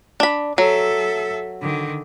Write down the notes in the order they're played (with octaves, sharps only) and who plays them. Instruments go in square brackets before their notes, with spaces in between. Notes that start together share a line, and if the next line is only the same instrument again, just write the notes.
[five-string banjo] D4 B5
[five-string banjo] F#3 [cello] A4 E5
[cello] D3 D#3